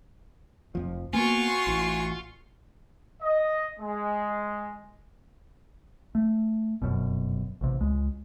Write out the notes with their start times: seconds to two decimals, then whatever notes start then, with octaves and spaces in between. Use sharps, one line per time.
0.75 F1 F2 F3
1.13 A#3 B3 F4 F#4 G#5 C6 C#6
1.67 A1
3.21 D#5
3.78 G#3
6.15 A3
6.82 F1 F#2 B2
7.61 A1 C3
7.81 C#2 G#3